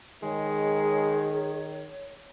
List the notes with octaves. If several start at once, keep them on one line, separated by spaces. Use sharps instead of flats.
D#3 G#3 G#4 C#5